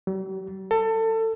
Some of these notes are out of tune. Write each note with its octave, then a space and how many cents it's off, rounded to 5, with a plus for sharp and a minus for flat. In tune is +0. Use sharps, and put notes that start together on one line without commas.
G3 -45
A4 +25